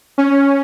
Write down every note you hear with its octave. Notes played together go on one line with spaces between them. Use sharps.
C#4